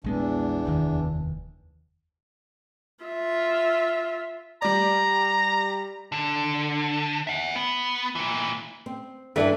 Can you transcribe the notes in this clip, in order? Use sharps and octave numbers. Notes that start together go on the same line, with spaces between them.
A#1 E2 E3 G#3 B3 D4
F1 D#2 D#3
F4 E5
G3 D5 A#5
D3
E5 F#5
B3
A#2 E3
C4
G2 E3 A3 D4 E5